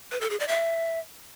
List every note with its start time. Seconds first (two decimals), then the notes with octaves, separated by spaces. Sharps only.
0.11 B4
0.21 A4
0.30 G#4
0.40 D5
0.48 E5